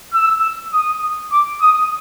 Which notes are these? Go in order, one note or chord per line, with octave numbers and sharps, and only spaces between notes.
E6
D#6
D6
D#6